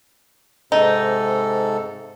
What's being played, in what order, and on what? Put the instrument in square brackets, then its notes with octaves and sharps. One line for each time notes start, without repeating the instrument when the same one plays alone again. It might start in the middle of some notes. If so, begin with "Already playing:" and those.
[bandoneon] G#2 C3 A4 [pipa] D#4